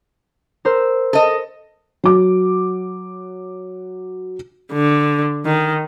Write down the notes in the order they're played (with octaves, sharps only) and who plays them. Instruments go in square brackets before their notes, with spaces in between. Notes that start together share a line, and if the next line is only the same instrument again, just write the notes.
[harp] A#4 C5 E6
[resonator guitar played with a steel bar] A4 D#5
[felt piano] F#3 D6
[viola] D3
D#3